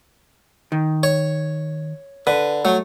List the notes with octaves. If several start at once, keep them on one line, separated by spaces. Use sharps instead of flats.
D#3
C#5
D3 B4
F#3 A3